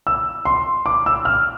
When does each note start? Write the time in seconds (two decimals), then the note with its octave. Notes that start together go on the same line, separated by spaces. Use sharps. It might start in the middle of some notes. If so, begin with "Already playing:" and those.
0.07 E6
0.45 C6
0.86 D6
1.06 E6
1.25 F6